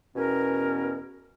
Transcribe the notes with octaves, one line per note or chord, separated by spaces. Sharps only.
E2 B2 C#4 A#4